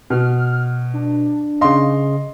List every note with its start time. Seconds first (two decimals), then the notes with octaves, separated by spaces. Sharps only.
0.10 B2 F6
0.94 D4
1.61 C#3 D#5 F5 C6